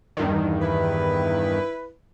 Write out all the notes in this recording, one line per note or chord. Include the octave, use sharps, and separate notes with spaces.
E2 G2 D#3
E4 B4